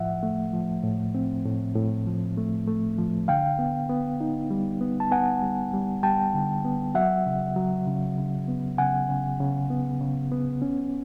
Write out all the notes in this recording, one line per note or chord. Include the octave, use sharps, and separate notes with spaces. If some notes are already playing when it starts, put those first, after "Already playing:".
Already playing: A2 F3 E5 F#5
A3
F3
A2
C4
A2
A2
F3
A3
A3
F3
D3 F5 G5
B3
B3
D#4
G3
B3
A5
B3 F#5 G#5
G3
G3
G3 G5 A5
D3
B3
F#3 E5 F#5
C#3
F#3
C#3
C#3
B3
C#3 F#5 G#5
C#3
C#3
B3
C#3
B3
C#4